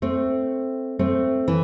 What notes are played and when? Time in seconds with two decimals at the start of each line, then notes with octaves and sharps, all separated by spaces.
0.02 A3 C4
0.99 A3 C4
1.48 E3